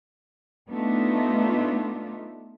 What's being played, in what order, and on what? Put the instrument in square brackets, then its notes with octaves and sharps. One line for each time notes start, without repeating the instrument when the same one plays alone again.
[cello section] A3 B3 D4 D#4 F4